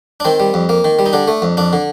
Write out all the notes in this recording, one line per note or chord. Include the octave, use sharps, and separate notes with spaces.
D4
D#3 C4
G3
F2
A#3
D#3
G3
D#4
D3 D4
A3
F2
F2 D4
D3